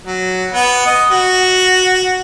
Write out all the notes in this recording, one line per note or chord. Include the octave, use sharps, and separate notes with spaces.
F#3
B3
D#5
F#4